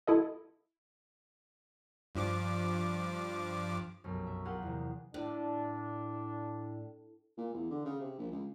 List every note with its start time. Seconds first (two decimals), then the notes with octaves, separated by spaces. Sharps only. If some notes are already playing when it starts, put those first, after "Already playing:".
0.07 E4 A4 D#5
2.15 G2 F3 D6
4.04 F1 B1 F#2
4.26 E5
4.45 F4 G4 G#4 A#4 F#5 G5
4.62 E2 C3
5.14 A2 D4
7.37 A#2
7.53 E2
7.70 D3
7.85 C#3
8.00 C3
8.18 A#1
8.31 C#2